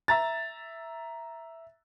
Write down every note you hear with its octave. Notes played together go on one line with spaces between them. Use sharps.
E5 A#5 A6